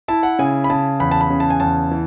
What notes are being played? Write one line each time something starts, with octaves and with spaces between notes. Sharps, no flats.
E4 A5
F#5
C#3 G#5
B5
C#3 A5
E2 B5
A5
B5
C#3
A5
G#5
E2 A5
E3